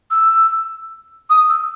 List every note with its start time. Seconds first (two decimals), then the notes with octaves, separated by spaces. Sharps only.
0.11 E6
1.30 D#6
1.49 E6